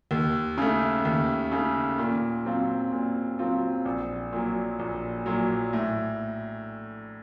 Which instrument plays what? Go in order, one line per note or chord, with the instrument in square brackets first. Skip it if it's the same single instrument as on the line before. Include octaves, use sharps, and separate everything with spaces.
[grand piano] D#2
C#3 A3
D#2
C#3 A3
A#2
F#3 C4 F4
A#2
F#3 C4 F4
A#1
A#2 F#3
A#1
A#2 F#3
A2